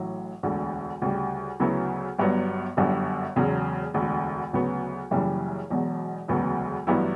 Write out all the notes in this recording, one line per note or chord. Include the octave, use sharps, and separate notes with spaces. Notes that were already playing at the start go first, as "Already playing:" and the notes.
Already playing: A1 A2 F#3
E1 D2 D3
D2 C#3 G3
D2 C#3 F#3 B3 E4
G1 G2 F#3 B3
G1 F#2 D3 G3
E1 E2 C#3 F#3
E1 D2 D3
D2 C#3 F#3 B3
F#1 F#2 C#3 E3 G3
E1 E2 B2 F#3
E1 D2 C#3 F#3 B3
A1 G2 F#3 B3 E4